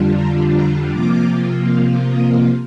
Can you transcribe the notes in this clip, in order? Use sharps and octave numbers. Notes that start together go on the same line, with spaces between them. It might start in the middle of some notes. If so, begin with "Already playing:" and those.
Already playing: F2 D3 G3 D4 F4
A#5
A#5
C3 F3 A#3 F4 D6
D#6